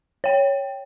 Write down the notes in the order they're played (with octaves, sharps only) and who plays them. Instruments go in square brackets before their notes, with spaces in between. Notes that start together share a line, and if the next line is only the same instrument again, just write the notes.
[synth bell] C#5 G5